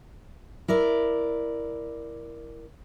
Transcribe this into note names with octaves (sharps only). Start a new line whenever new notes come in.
E4 A#4 D5